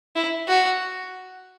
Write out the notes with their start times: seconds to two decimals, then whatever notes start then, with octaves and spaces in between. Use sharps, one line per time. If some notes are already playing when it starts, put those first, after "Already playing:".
0.16 E4
0.48 F#4